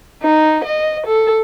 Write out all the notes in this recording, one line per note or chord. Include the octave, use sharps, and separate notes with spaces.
D#4
D#5
A4